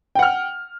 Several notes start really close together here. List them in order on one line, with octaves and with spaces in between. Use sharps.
G5 F#5 F6